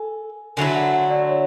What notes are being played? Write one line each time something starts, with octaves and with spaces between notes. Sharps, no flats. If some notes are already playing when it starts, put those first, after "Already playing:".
Already playing: A4 G#5
D3 F#3 A3 E4 G#5
F#5
F#5
D5
C#5